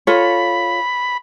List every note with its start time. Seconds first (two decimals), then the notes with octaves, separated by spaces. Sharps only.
0.07 F4 A4 C#5 B5